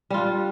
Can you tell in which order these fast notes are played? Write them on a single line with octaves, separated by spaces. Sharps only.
G3 F4 D4